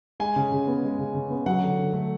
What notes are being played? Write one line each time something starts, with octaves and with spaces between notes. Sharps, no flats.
G#3 G#5
C#3
C#3
B3
G#3
C#3
C#3
B3
F#3 F#5
D3
D3
A3